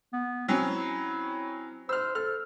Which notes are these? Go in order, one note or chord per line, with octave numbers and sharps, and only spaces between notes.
B3
F#3 C4 C#4 E4
C5 E6 F6
A4 F6